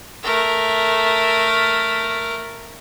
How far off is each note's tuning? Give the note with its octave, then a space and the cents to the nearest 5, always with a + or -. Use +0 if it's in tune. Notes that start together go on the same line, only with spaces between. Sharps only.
A3 +0 A#4 +0